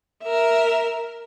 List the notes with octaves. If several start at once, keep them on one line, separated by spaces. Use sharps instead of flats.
A#4 E5